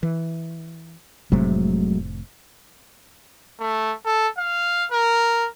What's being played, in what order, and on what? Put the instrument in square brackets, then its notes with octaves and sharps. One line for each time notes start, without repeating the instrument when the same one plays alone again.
[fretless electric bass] E3
[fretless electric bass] F1 A2 C3 [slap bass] F#3 G#3 A3
[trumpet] A3
A4
F5
A#4